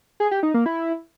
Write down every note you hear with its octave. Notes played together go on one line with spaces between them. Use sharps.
G#4
G4
D#4
A#3
E4